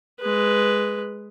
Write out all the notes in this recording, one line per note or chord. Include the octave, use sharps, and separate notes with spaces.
G#3 B4